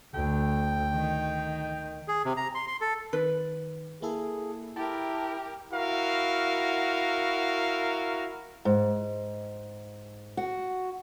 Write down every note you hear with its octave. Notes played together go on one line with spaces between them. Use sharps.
D2 G5
D#3
G#4
C3
A#5
C6
C6
A4
D#3 B4
A#3 E4 G#4 A4
E4 G4 A#4 A5
E4 F#4 A#4 F5
G#2
F#4